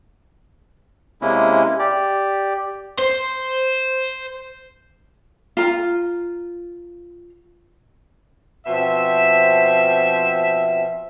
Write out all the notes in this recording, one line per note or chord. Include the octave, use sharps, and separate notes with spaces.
C3 G#3 A#3 C#4 E4
G4 D5
C5
F4 A#5
B2 F3 C4 E5